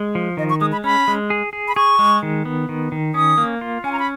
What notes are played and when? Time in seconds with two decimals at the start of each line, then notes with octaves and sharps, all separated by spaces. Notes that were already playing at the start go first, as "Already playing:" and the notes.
Already playing: G#3
0.15 F3
0.37 D#3 D#5
0.50 C#6
0.61 G#3 D#6
0.72 B5
0.84 C#4 B5
1.08 G#3
1.30 G#4
1.53 G#4
1.68 B5
1.76 G#4 C#6
1.99 G#3
2.23 D#3
2.45 B3
2.69 D#3
2.92 D#3
3.14 C#4 D#6
3.38 A#3
3.61 F4
3.84 C#4 G#5
3.92 A#5
3.99 B5